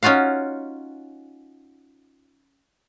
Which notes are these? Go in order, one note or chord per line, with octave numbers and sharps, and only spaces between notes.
C#4 D#4 F4 F#4 F5